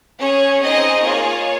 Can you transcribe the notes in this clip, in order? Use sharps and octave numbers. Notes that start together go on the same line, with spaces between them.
C#4 G#4 C#5
C4 D#4 G#4 D#5
A#3 F4 G#4 C#5